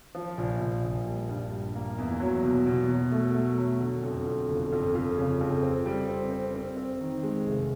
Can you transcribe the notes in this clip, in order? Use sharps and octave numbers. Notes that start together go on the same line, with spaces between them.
F3
A#1
A#1
A#1
G3
G2
G3
A#3
E2
F#3
B2
B2
F#3
A3
A3
F#3
D3
F2
F2
G1
F2
F2
C#3
F2
C4
G3
C4
C4
C4
C4
D#3
G#3
F1